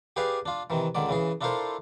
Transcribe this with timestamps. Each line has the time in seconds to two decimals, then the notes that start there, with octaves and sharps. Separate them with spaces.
0.16 G4 G#4 B4 D5 F5 G#5
0.46 D4 F4
0.70 C3 D#3 E3
0.95 C#2 D3 D#3 D5
1.09 C#3 E3 G#4
1.41 D4 E4 F4 A4 A#4 C5